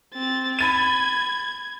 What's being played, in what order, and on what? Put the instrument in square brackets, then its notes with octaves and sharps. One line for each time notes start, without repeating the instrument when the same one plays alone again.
[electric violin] C4 A6
[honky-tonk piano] B5 A6 D#7 [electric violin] G#6